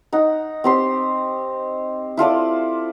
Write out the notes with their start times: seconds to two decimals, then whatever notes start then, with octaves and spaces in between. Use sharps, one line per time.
0.13 D#4 F#5
0.64 C4 G4 C6
2.17 E4 F4 A4 D5